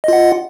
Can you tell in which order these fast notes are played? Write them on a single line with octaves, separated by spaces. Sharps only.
D#5 F4 F#5